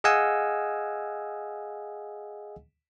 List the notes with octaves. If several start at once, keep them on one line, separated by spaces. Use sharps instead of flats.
G#4 D#5 F5 F#5 G#5 E6